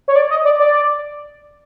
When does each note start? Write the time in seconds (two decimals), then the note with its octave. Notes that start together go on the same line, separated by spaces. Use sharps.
0.08 C#5
0.16 D5
0.30 D#5
0.45 D5
0.59 D5